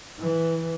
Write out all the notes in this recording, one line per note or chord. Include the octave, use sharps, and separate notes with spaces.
E3